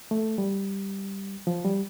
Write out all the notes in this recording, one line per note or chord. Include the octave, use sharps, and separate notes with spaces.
A3
G3
F3
G3